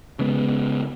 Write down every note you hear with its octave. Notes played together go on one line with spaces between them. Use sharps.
C#3 G#3 B3